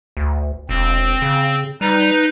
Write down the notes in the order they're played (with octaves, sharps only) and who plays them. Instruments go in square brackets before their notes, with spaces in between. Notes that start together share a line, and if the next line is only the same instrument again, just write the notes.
[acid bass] D2
[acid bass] E1 [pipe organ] C4
[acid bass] C#3
[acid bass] G3 [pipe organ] D#4 B4 A#5